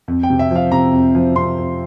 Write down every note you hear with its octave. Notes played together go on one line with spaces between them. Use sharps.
F2
G5
C3
E5
F3 F5
C3 A#5
F2
F3
C3 C6
F2